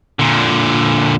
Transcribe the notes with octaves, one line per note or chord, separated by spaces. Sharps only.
A#2 D3